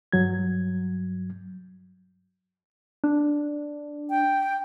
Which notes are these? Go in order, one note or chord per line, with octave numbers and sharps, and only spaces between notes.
G2 F#3 G#6
D4
G5